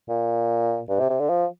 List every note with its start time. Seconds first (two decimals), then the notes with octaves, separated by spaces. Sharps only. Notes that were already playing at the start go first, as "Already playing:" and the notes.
0.09 A#2
0.89 G2
1.00 C3
1.10 C3
1.20 D3
1.29 F3